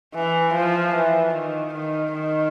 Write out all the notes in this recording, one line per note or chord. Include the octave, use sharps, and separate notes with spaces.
E3
F3
E3
D#3
D#3
D#3